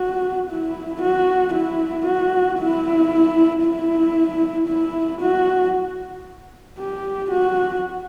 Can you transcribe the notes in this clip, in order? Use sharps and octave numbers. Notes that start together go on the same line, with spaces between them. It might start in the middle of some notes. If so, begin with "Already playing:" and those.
Already playing: F#4
E4
F#4
E4
F#4
E4
E4
E4
F#4
G4
F#4